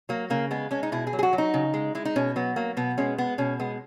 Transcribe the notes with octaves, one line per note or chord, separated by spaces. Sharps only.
F#3 A#3
C#3 A#3
G#3 B3
G#3 C#4
D#4
B2 E4
G#4
F#3
G#4
F#4
F#3
D#4
C#3
G#3
G#3 E4
D#4
B2 C#4
F#3 B3
F#3 A#3
B2 B3
G#3 C#4
G#3 B3
B2 C#4
G#3 B3